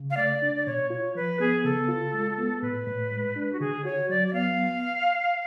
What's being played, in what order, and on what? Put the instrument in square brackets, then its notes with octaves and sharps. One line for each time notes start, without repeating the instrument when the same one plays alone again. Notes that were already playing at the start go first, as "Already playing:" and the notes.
Already playing: [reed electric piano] C#3
[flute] F5
[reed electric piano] A3 [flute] D5
[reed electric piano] D4
[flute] D5
[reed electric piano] B2 [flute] C#5
[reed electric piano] F4 [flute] C#5
[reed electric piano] F3 [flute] B4
[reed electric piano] B3 [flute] G#4
[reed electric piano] C#3 [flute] A4
[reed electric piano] F4
G#3
B3
[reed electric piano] A2 [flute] B4
[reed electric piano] A2
G#3
D4
[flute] F#4
[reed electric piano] D3 [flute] G#4
[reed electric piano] F#4 [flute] C#5
[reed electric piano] F#3 [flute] D5
[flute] D5
[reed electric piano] B3 [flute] F5